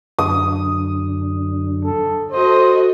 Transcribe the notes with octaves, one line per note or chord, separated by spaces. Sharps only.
F#2 D3 D#6
A4
F#4 A4 C5 D#5